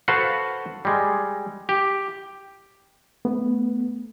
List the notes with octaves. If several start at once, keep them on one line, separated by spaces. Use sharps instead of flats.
F#4 A4 B4 C5 F5 F#5
G3 G#3
G4
A3 B3